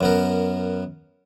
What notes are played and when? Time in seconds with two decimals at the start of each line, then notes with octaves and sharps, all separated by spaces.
0.01 F#2 B3 A#4